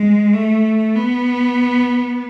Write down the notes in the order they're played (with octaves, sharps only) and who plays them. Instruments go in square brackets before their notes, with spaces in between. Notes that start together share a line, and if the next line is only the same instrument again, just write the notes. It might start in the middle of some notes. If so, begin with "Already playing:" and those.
Already playing: [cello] G#3
A3
B3